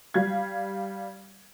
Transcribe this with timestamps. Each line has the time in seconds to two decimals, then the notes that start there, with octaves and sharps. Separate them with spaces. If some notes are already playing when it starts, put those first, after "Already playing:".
0.14 G3 F5 G#6